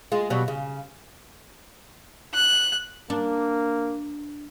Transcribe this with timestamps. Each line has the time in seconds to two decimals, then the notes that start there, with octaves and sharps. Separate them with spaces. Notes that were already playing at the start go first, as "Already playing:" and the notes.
0.12 G#3 F4
0.30 B2 F#3 G3
0.48 C#3
2.34 F#6
3.10 A#3 D4